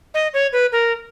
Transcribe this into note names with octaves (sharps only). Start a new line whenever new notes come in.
D#5
C#5
B4
A#4